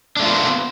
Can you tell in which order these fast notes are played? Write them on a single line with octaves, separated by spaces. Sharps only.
D4 A3 F4 C5 B3